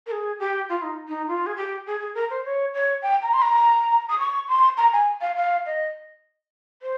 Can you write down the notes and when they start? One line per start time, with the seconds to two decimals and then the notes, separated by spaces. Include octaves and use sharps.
0.06 A#4
0.12 G#4
0.40 G4
0.69 F4
0.82 D#4
1.08 D#4
1.28 F4
1.46 G#4
1.56 G4
1.87 G#4
2.00 G#4
2.15 A#4
2.30 C5
2.45 C#5
2.74 C#5
3.02 G5
3.22 A#5
3.34 C6
3.42 A#5
4.10 D#6
4.19 C#6
4.49 C6
4.77 A#5
4.93 G#5
5.21 F5
5.36 F5
5.66 D#5
6.82 C5